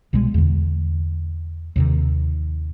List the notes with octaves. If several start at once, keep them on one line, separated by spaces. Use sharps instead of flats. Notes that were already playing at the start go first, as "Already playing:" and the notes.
C2 B2 G3 G#3
E2 D3
D#2 C3 D#3